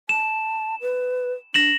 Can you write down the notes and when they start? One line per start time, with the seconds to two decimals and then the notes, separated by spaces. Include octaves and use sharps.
0.09 A5 E7
0.82 B4
1.54 D4 A#6 E7 F#7